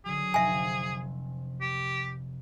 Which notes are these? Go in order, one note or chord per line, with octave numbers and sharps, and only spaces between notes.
D3 F#3 G#4
F1 C3 E5 G#5
G4